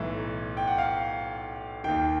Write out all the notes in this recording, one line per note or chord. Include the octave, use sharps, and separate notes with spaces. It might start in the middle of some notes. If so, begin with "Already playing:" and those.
Already playing: B1 A2 E3 E5
G5
F#5
F5
D#2 D#3 G5